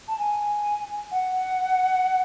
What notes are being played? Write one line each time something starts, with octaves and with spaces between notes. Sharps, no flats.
A5
G#5
F#5